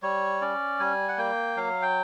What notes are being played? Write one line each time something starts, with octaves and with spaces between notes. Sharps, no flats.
G3 C#5
C#4 D5
G3 G#5
F#5
A#3 G5
F#3 F5
G5